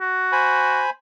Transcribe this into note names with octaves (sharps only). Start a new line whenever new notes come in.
F#4
C5 G#5 B5